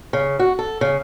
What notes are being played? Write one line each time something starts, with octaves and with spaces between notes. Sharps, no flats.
C#3
F#4
A4
C#3